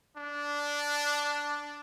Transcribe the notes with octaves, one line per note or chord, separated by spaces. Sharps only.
D4